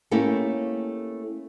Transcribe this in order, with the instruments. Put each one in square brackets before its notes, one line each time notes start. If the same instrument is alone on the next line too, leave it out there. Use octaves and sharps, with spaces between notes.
[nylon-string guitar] A3 A#3 C#4 E4 G4